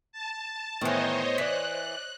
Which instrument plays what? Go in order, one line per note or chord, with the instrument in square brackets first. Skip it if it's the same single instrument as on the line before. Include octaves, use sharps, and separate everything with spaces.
[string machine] A5
[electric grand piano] A2 B3 [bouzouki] D#3 E3 [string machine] C5 C#5 D#5
[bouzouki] E3 [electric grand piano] D5 B6 [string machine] F#6